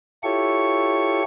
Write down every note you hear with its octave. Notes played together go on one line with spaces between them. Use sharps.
E4 F4 G4 A4 C#5 C#6